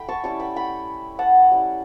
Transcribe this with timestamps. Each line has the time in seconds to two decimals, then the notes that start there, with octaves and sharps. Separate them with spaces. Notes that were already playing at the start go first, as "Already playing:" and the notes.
Already playing: A3 E4 G5 B5
0.09 A5 C#6
0.24 G3 C#4 E4 A5 C#6
0.40 G5 B5
0.56 G5 B5
1.19 F#5 A5
1.51 G3 C#4 E4